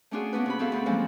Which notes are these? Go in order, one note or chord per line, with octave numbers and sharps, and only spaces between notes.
A3 C#4 D4 F4 F#4 G#4
A#3 B3 C#4 D4 B4
C3 F#4 B5
B3 C4 F#4 A4 E5 F5
D2 C4 B5
E3 F3 G3 G#3 A#3 C#4